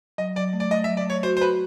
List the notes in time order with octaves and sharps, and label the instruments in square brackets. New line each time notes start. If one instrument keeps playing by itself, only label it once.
[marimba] F#3 [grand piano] D#5
[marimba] F#3 [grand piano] D5
[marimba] A3
[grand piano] D5
[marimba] A3 [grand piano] D#5
[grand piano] E5
[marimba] F#3
[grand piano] D5
[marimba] A3 [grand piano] C#5
[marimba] F#4 [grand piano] C5
[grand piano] C5
[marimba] F#4 [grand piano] B4